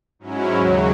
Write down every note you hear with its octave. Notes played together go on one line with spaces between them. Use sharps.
G#2 F#3 C#4 E4
D#2 C#3 F#3